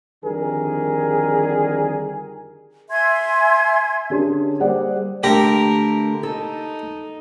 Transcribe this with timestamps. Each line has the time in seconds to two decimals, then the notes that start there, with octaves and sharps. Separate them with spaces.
0.23 F2 D3 D#3 G3 G#4 A#4
2.91 E5 G#5 C6 G#6
4.10 D3 C#4 D4 G4 G#4 A#4
4.60 G3 A#3 G#4 C5 D5 F#5
5.24 D3 A3 G4 A#4 A#5
6.23 D#4 A4